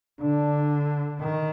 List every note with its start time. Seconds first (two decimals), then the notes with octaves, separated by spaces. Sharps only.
0.21 D3 D4
1.21 D#3